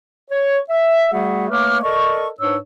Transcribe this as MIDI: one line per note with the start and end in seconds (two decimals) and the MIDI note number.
0.31 0.58 73
0.70 1.11 76
1.12 1.50 55
1.12 1.50 57
1.12 1.50 66
1.12 1.50 68
1.12 1.50 76
1.12 1.50 78
1.51 1.82 57
1.51 1.82 58
1.51 1.82 71
1.51 1.82 73
1.51 1.82 86
1.51 1.82 89
1.83 2.28 69
1.83 2.28 70
1.83 2.28 74
1.83 2.28 75
1.83 2.28 85
2.40 2.57 44
2.40 2.57 62
2.40 2.57 71
2.40 2.57 73
2.40 2.57 88